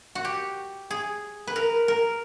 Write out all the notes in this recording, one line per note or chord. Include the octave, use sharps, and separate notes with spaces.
F#4
G4
G#4
B4
A#4
A#4